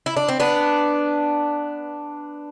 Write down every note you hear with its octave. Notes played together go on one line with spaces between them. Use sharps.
E4
D4
C4
B3 D4